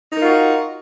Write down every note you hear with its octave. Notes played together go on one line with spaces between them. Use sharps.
D#4 F4 F#4 A#4